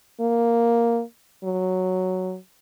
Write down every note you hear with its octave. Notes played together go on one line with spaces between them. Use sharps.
A#3
F#3